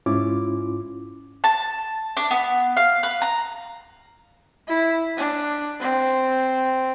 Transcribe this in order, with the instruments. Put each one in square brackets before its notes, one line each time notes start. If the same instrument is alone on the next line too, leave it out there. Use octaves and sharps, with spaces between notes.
[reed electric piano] G#2 C#4 E4 F4 D6
[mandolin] A5
D4
B3
F5
B4
A#5
[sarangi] E4
D4
C4